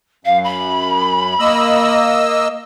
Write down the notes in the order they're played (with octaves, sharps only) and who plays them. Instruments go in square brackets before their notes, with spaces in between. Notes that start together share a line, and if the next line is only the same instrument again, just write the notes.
[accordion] F#2 [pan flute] F5
[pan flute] B5
[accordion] A#3 D#5 E6